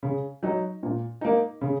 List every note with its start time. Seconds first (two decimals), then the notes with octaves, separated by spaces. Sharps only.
0.03 C#3
0.43 F#3 D#4
0.83 A#2
1.21 A#3 D#4
1.61 C#3